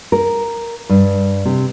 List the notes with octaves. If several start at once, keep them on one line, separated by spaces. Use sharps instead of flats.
A#4
G2
C3